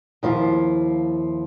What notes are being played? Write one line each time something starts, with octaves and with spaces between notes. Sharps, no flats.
D#2 F3 E4 F4